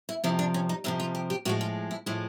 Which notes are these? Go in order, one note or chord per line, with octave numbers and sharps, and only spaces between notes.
E4
F2 C3 F3 E4
D4
C#4
D#4
F2 C3 F3 E4
F4
G4
G4
A2 F3 G#3 F#4
F4
E4
A2 F3 G#3 E4